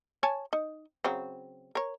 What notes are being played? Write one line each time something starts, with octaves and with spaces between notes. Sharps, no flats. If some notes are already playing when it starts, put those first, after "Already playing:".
C#5 G#5 A5
D#4
C#3 F#3 C4
A#4 C#5